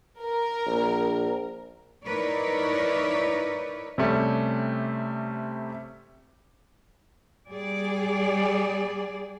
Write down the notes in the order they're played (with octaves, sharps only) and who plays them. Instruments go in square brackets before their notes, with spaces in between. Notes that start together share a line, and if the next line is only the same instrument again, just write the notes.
[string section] A#4
[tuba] A#1
[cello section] D#4 E4 A#4 B4 C#5 D5
[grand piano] C3 G3 A3 C#4
[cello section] G3 G#4 D5